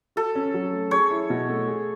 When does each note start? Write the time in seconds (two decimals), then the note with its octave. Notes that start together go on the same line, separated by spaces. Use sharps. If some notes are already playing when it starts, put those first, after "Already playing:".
0.16 F#4 A4
0.35 C#4
0.54 F#3
0.72 A3
0.91 G#4 C#5
1.10 E4
1.30 B2
1.49 A3
1.68 G#4